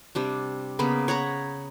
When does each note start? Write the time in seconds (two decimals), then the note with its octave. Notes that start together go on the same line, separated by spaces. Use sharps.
0.15 C3 G3 D4
0.79 C#3 A#3 B3 B5
1.08 C#5 F#5 A#5 B5